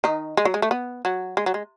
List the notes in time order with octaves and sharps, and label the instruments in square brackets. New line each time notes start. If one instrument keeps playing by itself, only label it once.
[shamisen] D#3 D#4
G#3
F#3
G#3
A3
B3
F#3
G#3
F#3
G#3